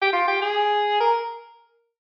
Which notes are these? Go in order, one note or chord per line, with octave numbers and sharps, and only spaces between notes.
G4
F4
G4
G#4
A#4